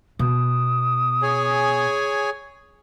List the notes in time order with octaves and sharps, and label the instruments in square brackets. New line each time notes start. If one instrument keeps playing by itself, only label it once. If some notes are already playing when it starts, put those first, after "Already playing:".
[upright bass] B2 [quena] D#6
[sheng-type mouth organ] G#4 C#5 G#5